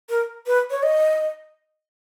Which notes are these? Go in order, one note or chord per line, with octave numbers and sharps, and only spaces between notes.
A#4
B4
C#5
D#5